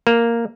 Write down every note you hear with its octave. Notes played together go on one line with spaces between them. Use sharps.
A#3